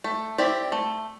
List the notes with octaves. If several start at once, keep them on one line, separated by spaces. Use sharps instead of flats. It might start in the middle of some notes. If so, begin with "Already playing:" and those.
A3
C4 E4 G4 D5
A3